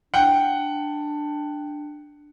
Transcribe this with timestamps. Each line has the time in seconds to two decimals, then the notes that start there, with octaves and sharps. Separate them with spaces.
0.14 D4 F#5 G5